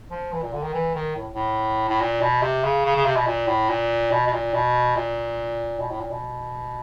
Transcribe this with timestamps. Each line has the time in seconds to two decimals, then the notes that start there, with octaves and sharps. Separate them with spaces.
0.11 F3
0.32 E3
0.42 A#2
0.53 D3
0.63 D#3
0.74 E3
0.95 D#3
1.16 A2
1.34 A2
1.89 A2
2.01 A#2
2.21 B2
2.42 C3
2.64 C#3
2.85 C#3
2.96 C#3
3.05 C3
3.16 B2
3.27 A#2
3.47 A2
3.69 A#2
4.11 B2
4.27 B2
4.33 A#2
4.54 B2
4.96 A#2
5.80 B2
5.90 A2
6.01 A#2
6.11 B2